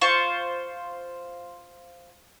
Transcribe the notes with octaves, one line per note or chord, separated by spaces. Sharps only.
F4 C5 C#6